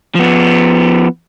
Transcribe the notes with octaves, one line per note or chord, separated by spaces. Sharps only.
F3 B3